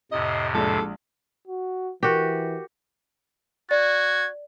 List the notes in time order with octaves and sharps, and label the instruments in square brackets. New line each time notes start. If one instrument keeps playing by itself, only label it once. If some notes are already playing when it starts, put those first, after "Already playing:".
[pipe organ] F2 A2 C3 [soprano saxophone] D#5
[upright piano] A#1 G#3 D4 [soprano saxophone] A4
[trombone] F#4
[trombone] E3 [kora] F#4 G4 [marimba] A#4
[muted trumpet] F#4 [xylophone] D5 [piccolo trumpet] G#6